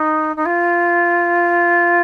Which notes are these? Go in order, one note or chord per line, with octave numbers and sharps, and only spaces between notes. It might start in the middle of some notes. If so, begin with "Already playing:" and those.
Already playing: D#4
D#4
F4